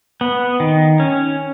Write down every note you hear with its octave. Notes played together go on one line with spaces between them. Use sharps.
B3
D#3
C#4